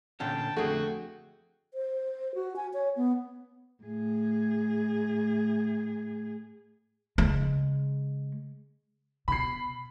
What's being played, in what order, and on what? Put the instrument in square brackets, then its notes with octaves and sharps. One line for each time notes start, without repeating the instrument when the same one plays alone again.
[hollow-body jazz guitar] A#2 D3 C#4 [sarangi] G5 [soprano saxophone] A5
[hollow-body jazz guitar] F2 D3 [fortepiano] A3 G#4 [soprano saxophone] F#4
[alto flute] C5
F#4
G#5
C#5
B3
[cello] A2 G#4
[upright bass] C#3 G#3
[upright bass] B2 [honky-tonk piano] B5 C7